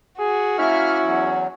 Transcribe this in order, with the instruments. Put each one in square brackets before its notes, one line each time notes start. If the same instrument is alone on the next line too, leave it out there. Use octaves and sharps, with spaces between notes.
[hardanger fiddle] F#4 [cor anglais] G#4
[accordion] A#3 E5 F6 [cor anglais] C#4 [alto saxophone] E4
[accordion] E2 F#3